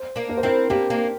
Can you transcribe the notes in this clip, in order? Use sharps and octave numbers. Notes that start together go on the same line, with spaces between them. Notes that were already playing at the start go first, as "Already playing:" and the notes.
Already playing: C5
A#3 D4
A#4
C5
C4 E4 A#4
A#3 D4 G4
A#3 D4